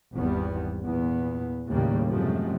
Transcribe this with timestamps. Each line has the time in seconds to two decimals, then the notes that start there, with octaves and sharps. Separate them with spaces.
0.13 G#1 E2 G3 B3
0.84 E2 A#2 B3
1.70 D#2 A2 C#3 G3 A#3
2.09 F#2 C3 F3 G#3 A3